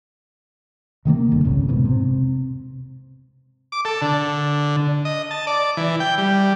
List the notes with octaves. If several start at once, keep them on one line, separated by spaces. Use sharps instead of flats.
C3 D#3 A3 A#3
G1 D3
E1 C2 A2 C#3
F1 G#2 B2
C3
D6
A4
D3
D#5
A5
D5
E3
G5
G3